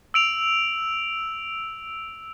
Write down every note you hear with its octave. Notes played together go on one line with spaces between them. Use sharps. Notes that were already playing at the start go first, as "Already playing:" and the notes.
E6 D7 F7